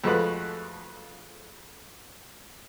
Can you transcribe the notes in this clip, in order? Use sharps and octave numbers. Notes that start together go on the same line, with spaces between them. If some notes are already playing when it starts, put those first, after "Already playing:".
F2 F3 G#3 A3 F#4 B4